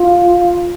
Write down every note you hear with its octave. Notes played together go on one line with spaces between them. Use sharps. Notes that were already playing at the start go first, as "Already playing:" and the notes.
Already playing: F4